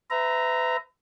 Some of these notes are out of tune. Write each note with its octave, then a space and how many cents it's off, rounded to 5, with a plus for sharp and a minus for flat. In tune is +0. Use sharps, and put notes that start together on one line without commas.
B4 +40 E5 +0 A#5 +0